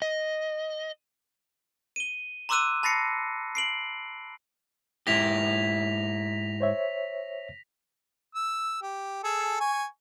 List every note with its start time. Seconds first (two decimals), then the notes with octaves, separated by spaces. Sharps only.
0.02 D#5
1.96 D#7 G7
2.49 A#5 C6 D6 E6 F#6 D#7
2.83 A5 B5 A6 A#6 C7 C#7
3.55 C7 D7 F#7
5.07 G#2 E4 G4 A#6 B6 F7
6.60 C5 C#5 E5
8.35 E6
8.82 G4
9.24 G#4 A4 E6
9.60 G#5 C#6